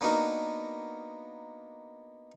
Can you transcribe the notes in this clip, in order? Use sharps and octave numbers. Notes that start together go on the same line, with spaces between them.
A#3 B3 D4 D#4 F#4 A#4